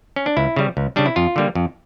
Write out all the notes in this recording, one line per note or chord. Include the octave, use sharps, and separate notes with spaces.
C#4
D4
C#2 E4
C#3 G3
C#2
C#3 G3 D4
E4
F2 F4
D3 G3 A#3
F2